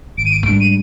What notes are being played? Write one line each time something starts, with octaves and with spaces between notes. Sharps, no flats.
G#1 D7
D#7
D7
G#2 G3 D4 D7
D#7